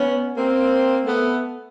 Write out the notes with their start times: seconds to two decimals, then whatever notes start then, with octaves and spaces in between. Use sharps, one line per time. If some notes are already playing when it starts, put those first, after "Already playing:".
Already playing: B3 C#4
0.36 A#3 C4
1.06 A3 B3